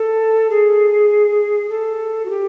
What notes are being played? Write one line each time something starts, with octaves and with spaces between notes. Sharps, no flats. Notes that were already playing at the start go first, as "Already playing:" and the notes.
Already playing: A4
G#4
A4
F#4
G4